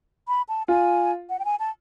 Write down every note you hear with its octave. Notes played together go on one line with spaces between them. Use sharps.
B5
A5
F4 G#5
F#5
G5
G#5
A5